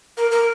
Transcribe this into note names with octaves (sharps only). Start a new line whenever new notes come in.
A#4
A#4